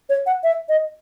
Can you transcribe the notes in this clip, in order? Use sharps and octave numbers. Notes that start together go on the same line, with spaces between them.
C#5
F#5
E5
D#5